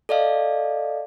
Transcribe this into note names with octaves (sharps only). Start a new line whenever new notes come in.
A4 D5 D#5 F5